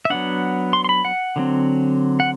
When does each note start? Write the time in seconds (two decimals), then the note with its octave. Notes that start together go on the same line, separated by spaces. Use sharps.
0.05 E5
0.10 F#3 B3 D4 F#5
0.73 C6
0.84 C6
0.89 B5
1.05 F#5
1.36 D3 F#3 C4
2.20 F#5